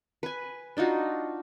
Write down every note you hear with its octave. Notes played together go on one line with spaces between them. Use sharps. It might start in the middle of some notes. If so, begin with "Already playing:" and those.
B4 G#5
D4 D#4 F4 F#4